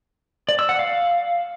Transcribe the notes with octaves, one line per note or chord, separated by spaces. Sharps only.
D5
E6
F#5
F5